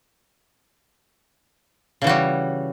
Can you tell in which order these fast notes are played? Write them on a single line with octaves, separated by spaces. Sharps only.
C#3 E3 F#4 G3